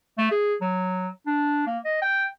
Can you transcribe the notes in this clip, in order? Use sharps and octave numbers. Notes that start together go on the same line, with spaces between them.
A3
G#4
F#3
D4
A#3
D#5
G5